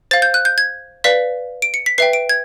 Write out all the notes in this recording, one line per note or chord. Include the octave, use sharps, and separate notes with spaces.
C5 F5 A6
G6
F#6
G6
G#6
B4 D5 F5 B6
D7
C#7
B6
B4 E5 G5 C7
D7
G#6